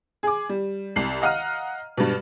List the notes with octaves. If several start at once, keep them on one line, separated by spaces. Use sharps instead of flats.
G#4 D6
G3
C2 C7 F#7
D#5 F5 F#5 A#5 F6 D#7
G2 B2